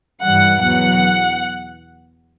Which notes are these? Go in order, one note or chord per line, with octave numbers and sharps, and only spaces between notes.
G2 E3 G3 F#5
E2 B2 F#3 F#5